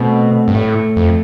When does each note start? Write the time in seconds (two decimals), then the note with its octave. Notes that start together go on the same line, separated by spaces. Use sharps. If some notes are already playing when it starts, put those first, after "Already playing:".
Already playing: B2 A3 C4
0.48 G2
0.55 A2 A3
0.97 F2